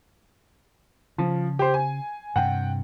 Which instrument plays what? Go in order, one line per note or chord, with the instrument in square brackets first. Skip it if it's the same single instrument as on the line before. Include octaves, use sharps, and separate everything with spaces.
[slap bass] C#3 [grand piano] F3
[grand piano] G4 C5
G#5
[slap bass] G2 C3 [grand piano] F#5 G5